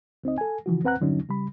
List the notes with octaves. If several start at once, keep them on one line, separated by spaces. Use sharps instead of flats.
C#2 C4 D#4 D#5
A4 G#5
C#3 E3 F3 F#4
D#2 C4 B4 F#5 A#5 F#6
E2 G2 D3 F#3 C#4 D#4
C#3 G3 B5